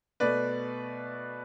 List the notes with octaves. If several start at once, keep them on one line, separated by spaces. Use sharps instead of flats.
B2 A3 B4 D5